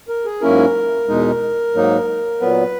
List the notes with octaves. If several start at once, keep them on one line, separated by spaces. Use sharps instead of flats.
A#4
G#4
G#2 F#3 A#3 C#4 E4 A#4
E2 B2 G#3 D#4
G#2 F#3 A#3 D#4
A#2 F#3 B3 B4